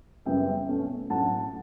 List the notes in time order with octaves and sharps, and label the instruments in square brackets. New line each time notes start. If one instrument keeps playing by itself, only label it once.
[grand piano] F#2 C#3 G3 B3 E5 G5
B2 A3 C#4
A2 F#3 A3 C#4 F#5 A5